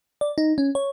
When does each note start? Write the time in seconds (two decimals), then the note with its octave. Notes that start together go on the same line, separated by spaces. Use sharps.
0.21 D5
0.38 D#4
0.58 C#4
0.75 C#5